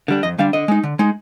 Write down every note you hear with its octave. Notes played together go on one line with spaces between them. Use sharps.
D3 G3 D4
F2 D#5
D3 G3 D4 F5
D3 D#5
G#3 D#4
D3
G#3 D#4